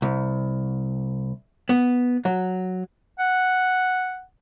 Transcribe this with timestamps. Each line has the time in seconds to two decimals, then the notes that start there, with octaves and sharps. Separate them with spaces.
0.02 C2
1.69 B3
2.25 F#3
3.19 F#5